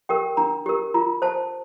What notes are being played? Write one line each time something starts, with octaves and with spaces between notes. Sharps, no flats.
G4 A#4 G5
D4 A#5
G4 A#4
F4 A#5
C5 A5